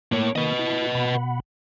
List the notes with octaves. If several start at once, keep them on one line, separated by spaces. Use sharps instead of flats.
A2 A#3 C#5 D6
D#3 A#3 B4 D#5
E4
B2 F#5 B5